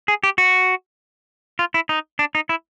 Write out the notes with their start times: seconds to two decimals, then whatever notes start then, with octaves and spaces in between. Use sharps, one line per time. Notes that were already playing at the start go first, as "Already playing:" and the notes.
0.08 G#4
0.23 G4
0.38 F#4
1.59 F4
1.74 E4
1.89 D#4
2.19 D4
2.35 D#4
2.49 E4